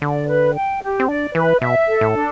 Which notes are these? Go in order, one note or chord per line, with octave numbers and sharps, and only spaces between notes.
D3 D5
B4
G5
G4
C4
D4 D5
E3 B4
B2 E5
A4
A2
D4